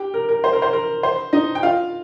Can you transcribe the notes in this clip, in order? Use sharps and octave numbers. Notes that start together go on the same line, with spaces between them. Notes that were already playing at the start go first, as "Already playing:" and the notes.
Already playing: G4 G5
A#4
A#4
C5
A#4
C5
A#4
C5
D#4 D#5
G5
F4 F5